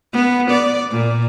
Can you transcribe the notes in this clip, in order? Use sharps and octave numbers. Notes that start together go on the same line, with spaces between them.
B3
D5
A#2